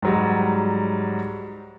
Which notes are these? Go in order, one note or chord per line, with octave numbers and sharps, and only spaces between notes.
G#2 F#3 G3